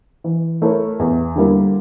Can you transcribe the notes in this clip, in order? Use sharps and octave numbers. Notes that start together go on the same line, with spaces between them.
E3
A3 E4 A#4 C#5
E2
D3 G3 A#3 E4